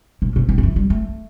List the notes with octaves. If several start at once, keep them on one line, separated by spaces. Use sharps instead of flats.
B2
B2
E3
D#3
E3
G3
A3